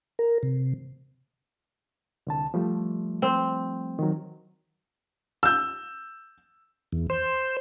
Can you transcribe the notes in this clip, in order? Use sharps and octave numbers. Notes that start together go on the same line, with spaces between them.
A#4
C3
C2 D3 A5
F3 G3 A3
C4
D#3 F#3
E6 G6
E2
C5